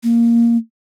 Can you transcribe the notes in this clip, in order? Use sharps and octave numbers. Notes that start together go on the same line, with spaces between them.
A#3